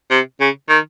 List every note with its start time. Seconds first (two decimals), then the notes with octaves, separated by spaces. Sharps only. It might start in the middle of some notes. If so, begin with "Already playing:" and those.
0.10 C3
0.40 C#3
0.69 D#3